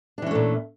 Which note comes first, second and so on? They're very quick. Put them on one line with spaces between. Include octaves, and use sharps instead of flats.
D4 E3 C#4 A3 A#2